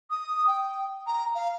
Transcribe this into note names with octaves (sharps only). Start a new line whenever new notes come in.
D#6
G5
A#5
F5